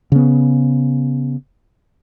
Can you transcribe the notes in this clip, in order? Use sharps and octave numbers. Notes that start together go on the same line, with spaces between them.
C#3 B3